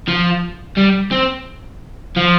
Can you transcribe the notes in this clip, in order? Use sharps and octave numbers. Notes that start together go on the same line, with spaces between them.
F3
G3
C4
F3